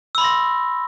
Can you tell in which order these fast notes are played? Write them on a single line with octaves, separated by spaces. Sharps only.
E6 B5 C6 A#6